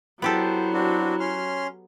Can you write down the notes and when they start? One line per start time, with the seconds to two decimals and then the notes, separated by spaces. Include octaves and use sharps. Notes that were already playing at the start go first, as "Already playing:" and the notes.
0.22 F#3 B3 E4 G4 A4 C5
0.74 C4 D4 F#4
1.20 C#4 C6 F6